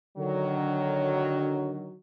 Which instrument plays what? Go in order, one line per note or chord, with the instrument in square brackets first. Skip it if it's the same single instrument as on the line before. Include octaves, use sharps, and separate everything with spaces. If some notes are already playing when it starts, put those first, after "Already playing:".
[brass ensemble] D3 D#3 F#3